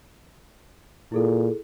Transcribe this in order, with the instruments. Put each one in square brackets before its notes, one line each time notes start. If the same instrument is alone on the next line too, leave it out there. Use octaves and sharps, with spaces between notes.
[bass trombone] A#2 [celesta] E4 G#4 A4